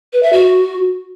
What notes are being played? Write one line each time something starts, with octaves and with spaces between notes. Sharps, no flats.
B4
E5
F#4